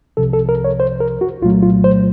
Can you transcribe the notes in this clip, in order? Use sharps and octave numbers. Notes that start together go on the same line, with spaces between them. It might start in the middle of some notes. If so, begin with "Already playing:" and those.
C2 C3 F3 A4
A4
A#4
C#5
C5
A#4
F#4
C2 A#2 F#3 A3 F4
F4
C5